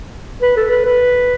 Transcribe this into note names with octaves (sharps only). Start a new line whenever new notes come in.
B4
A4
B4
B4